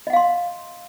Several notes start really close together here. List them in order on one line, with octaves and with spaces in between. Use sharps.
D#5 F#5 F5 C6